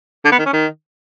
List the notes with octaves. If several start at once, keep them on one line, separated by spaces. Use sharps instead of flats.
D3
B3
D#3
C#4
D#3